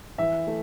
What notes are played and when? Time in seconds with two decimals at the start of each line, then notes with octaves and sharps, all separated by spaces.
0.18 E3 E5
0.47 A3